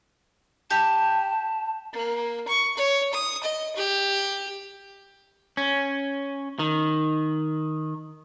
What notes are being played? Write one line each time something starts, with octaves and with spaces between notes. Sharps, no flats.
G4 A5
A#3
C#6
C#5
D#6
D#5
G4
C#4
D#3